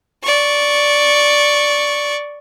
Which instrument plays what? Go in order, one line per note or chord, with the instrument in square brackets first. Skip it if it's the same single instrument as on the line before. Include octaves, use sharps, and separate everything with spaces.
[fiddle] D5 C#6